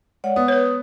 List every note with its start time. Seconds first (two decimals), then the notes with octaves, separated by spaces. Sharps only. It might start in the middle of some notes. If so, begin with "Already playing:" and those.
0.24 G#3 C#5 D5 F#5
0.36 B3 F#5 D#6
0.48 B4 C#5 D#6